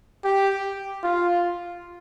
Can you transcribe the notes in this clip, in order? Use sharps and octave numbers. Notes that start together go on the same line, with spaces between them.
G4
F4